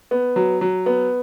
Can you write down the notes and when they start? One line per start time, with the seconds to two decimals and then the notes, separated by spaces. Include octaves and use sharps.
0.11 B3
0.36 F#3
0.61 F#3
0.86 B3